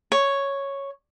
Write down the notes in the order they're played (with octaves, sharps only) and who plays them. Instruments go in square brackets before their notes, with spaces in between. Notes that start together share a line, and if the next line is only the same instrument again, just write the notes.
[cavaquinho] C#5